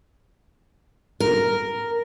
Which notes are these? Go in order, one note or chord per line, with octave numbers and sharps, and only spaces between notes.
A#4